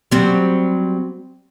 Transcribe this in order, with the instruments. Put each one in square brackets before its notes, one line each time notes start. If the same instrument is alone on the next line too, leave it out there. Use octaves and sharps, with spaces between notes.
[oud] F#3 G3 C4